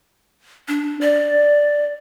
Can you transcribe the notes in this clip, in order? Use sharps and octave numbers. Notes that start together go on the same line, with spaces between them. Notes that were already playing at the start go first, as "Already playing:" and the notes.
D4
D5